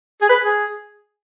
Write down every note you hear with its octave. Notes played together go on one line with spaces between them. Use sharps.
G#4
B4
G#4